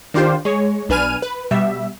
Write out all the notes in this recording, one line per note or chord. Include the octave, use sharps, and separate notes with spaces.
D#3 D4 F4 G4 C5
G#3 C#5
B1 D4 B4 G#5 F6 D#7
B4
B2 G3 E5